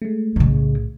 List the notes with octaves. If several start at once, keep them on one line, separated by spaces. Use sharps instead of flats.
G#3 A3
B1 A2 C#3 G#3